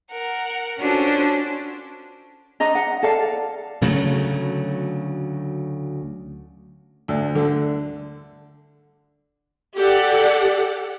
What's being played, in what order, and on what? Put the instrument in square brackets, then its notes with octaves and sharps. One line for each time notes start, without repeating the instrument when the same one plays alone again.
[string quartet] A#4 F#5
C#4 D4 F4 F#4 A4 C5
[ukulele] D4 D#5 A#5
F#5
A4 D5 F5
[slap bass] D2 C#3 F#3 A3
[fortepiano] D2
D3
[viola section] G4 A4 D5 F#5